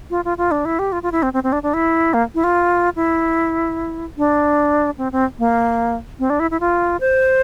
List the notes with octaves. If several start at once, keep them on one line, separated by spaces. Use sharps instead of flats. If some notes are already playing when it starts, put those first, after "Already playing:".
F4
F4
F4
D4
E4
G4
F4
F4
E4
C4
C4
C4
D4
D4
E4
A#3
E4
F4
E4
D4
C4
C4
A#3
C4
D4
E4
E4
F4
C5